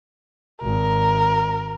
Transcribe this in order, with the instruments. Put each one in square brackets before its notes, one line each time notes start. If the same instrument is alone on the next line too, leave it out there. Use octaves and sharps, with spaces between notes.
[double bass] G#1 [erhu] A#4